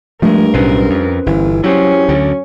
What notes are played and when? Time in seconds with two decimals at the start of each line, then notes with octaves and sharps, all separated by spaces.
0.22 G2 F3 G#3 A3 A#4
0.54 B1 A2 C#4 B4 C5
0.90 F2
1.26 G1 E3
1.64 F#2 F#3 C#4 E4 G4 C5
2.09 D2 D3